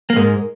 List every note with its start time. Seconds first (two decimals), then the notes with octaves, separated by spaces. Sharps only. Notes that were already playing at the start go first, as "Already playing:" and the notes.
0.10 A#3
0.16 G#2 G#3 A#4